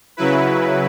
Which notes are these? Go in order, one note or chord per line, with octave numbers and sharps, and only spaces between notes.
C#3 F#3 E4 B4